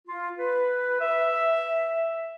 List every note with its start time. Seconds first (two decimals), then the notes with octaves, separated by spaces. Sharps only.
0.08 F4
0.39 B4
1.01 E5